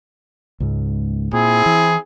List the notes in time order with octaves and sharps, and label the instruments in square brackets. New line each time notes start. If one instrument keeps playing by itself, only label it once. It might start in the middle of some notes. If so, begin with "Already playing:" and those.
[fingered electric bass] C#2 G#2
[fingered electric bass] A#2 [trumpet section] C4 E4 G#4
[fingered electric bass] E3